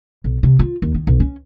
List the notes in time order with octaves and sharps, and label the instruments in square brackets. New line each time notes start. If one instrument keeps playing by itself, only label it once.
[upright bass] B1
C3
F4
D#2
D#3
B1
C#4